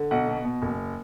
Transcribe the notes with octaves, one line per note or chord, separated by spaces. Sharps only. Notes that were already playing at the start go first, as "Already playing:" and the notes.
Already playing: D3
B1 F#5
B2
B2
F#1